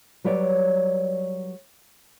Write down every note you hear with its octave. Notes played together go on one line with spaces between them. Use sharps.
F#3 G3 B4 C#5 D5